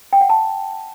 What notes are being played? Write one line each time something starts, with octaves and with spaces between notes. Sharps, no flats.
G5
F#5
A5